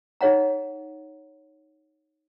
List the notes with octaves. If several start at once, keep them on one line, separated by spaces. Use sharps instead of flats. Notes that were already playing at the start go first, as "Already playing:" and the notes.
D#4 G#4 C#5 F#5 A#5